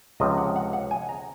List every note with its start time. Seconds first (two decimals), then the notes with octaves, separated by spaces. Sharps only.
0.20 C#2 C3 F3 D#5
0.38 F#5
0.56 F#5
0.73 F#5
0.91 G#5
1.09 A#5